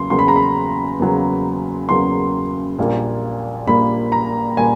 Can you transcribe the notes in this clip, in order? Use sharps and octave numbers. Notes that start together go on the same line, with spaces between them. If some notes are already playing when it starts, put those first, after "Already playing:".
Already playing: E2 C#3 F#3 A#3 C6
E2 C#3 F#3 A#3 C6
B5
A#5
B5
E2 C#3 F#3 A#3
E2 C#3 F#3 A#3 C6
A#1 A#2 G3 A#3
A#1 A#2 G3 A#3 B5
A#5
A#2 G3 A#3 G#5